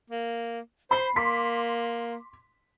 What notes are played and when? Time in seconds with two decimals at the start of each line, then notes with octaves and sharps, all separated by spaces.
0.10 A#3
0.91 C5 B5 C7
1.16 A#3 C6 D6 B6